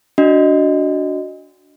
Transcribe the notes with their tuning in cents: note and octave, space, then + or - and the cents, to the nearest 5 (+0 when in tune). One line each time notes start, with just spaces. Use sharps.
D4 -15 F#4 +0 D#5 +0